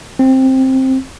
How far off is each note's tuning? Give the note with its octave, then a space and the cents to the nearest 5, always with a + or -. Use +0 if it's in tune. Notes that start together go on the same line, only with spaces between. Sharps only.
C4 +10